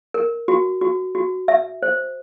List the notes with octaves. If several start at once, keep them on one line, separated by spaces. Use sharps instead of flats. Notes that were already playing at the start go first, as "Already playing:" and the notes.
A#4
F#4
F#4
F#4
E5
C5